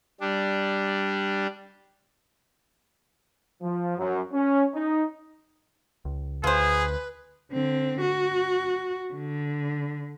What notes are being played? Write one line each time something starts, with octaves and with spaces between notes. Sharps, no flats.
G3 D4
F3
F#2
C#4
D#4
C#2
D2 F4 G#4 B4 C5
D3 C4
F#4
D3